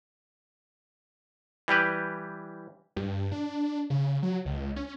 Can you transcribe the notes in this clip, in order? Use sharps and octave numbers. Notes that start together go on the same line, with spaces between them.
E3 G3 G4 B4
G2
D4
C#3
F#3
C#2
C#4